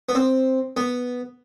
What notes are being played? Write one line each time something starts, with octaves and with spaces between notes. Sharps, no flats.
B3
C4
B3